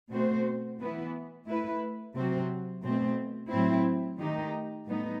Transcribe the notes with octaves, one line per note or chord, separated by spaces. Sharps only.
B2 A3 C4 F#4 C5
E3 B3 E4 B4
A3 E4 B4
C3 F#3 C4 F#4
B2 A3 C4
A2 F#3 C4 E4
D#3 A3 D#4 G4
A2 G3 B3 D#4